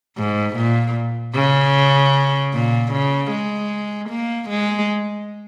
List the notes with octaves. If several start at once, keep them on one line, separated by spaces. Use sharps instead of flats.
G#2
A#2
C#3
A#2
C#3
G#3
A#3
G#3